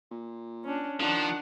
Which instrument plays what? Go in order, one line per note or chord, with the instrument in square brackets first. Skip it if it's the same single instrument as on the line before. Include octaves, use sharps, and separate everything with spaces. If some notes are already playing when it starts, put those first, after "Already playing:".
[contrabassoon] A#2
[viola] C#4 D4
[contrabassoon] D#3 [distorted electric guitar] F3 [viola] D4 F#5